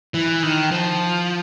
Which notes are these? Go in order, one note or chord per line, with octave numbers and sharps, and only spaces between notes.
E3
D#3
F3